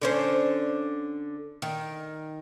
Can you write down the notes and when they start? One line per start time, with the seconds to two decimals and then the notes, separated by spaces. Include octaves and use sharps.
0.02 D3 C#4 C5
1.62 D#3